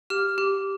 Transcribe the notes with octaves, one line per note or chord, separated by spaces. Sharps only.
G4 F6
G4